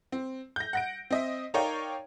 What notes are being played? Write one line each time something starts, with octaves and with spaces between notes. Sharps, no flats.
C4
G6 A#6
F#5 A#6 D7
C4 D#5 E5
D#4 A#4 C#5 D5 F5 G5